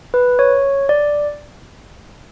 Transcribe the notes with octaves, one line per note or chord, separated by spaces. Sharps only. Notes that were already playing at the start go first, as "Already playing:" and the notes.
B4
C#5
D5